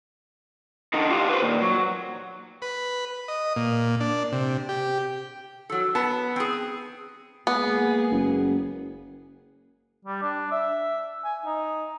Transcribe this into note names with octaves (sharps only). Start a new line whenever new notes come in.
D3 D#4
F4 G4
B4 C5
A#2 D#3
F#3
B4
D#5
A#2
D4
C3
G4
F#3 A4
B3 A5
C4 G#4
G#3 A#3 B3 G#4
F#1
G3
D4
E5
G#5
D#4